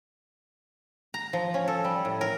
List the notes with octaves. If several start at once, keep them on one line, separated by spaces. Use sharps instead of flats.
A#5
F3
C#4
A4
G3
A2
A#4